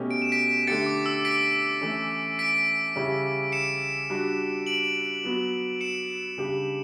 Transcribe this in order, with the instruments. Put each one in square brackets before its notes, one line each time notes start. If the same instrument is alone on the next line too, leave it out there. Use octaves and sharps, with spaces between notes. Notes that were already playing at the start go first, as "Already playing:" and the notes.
Already playing: [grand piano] B2 A3 C#4 G4
[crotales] D7
E7
B6 D7
[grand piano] D3 A3 D4 G4 [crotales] A6 C#7
[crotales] D6
E6
B6 D7
[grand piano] E3 A3 C#4
[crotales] B6 D7
[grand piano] C#3 G3 C#4 E4 G4
[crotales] C#7 E7
[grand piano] G3 D4 F#4
[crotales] D7 F#7
[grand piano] F#3 B3 F#4
[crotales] C#7 E7
[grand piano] C#3 G3 D4 G4